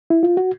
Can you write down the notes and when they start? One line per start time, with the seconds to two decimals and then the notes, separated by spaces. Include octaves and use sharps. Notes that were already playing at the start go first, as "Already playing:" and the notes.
0.10 E4
0.23 F4
0.37 F#4